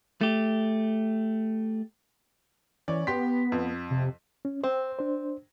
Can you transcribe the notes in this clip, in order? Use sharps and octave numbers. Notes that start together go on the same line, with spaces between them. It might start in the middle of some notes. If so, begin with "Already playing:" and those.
A3 G4
E3 C#4 D5
B3 G4 C6 B6
F2
C3
C#4
C4 C5
D4 C5